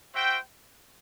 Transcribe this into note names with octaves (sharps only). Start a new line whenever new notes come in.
F#4 C5 E5 G5